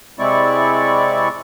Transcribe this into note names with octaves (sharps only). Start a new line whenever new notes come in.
C3 G#3 C4 E4 D5 C#6